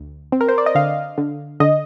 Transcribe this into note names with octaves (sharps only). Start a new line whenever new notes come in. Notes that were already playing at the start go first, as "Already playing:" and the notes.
Already playing: D2
C4
A#4
C5
D5
D#5
D3 F5
D3
D3 D#5